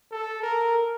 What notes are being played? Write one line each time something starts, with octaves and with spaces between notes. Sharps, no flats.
A4
A#4